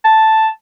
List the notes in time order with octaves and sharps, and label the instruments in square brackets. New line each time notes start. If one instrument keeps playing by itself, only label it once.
[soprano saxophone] A5